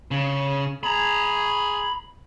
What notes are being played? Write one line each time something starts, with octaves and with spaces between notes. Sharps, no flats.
C#3
G#4 A#5 B5